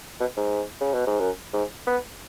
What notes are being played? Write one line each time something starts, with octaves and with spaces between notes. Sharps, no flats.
B2
G#2
C#3
B2
G#2
F#2
G#2
B3